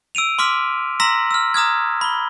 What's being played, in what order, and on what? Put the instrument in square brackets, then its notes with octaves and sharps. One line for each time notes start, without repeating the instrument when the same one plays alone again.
[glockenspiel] E6 D7 D#7 F7
C6 D6 F6 B6
A#5 C6 E6 A#6 B6 F#7
E6 F6
A#5 D#6 F6 G#6
B5 G7